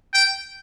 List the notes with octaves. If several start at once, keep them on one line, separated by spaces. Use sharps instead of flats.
G5